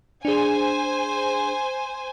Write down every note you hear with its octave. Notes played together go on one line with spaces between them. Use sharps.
D4 G#4 C5 G#5